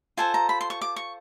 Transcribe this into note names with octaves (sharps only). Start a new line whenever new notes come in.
F4 A4 C5 G#5
A#5
B5
C6
C#6
D6
C#6